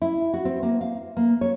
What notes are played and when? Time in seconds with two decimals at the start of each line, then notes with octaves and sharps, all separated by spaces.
0.02 E4
0.34 F#4
0.45 C4
0.63 A#3
0.81 F5
1.17 A#3
1.41 C#5